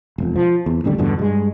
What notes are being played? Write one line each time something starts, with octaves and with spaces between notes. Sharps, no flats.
E1 F2
F3
E2
A1 D#2 D3 G3
E2 G2 B2 D3
G2 G#3